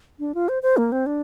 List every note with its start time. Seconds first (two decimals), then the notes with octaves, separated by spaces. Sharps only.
0.19 D4
0.35 F4
0.49 C5
0.63 C5
0.77 A#3
0.92 C4
1.06 D4